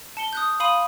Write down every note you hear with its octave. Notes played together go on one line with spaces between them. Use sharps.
A5 C#7 G7
D#6 F#6 G6
F5 B5 C6 D#6 D#7